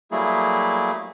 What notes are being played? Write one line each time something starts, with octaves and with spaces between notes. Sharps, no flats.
F#3 G3 A3 A#3 E4 G#4